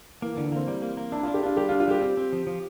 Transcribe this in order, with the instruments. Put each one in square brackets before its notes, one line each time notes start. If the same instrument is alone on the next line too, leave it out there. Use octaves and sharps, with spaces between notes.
[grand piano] E3 [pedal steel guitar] A#3
[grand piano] E3
[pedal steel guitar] D3
[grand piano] E3
[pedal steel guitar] A#3 [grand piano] C4
[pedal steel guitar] G3
A#3
A#3
[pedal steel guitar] D4 [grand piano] E4
[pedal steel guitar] D4 [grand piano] F4
[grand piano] G4
[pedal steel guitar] D4 [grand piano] F4
[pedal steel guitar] G3 [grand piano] G4
[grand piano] F4
[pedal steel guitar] D4
[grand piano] F4
[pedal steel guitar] G3 [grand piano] G4
[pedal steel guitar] C4
C4
F3
F3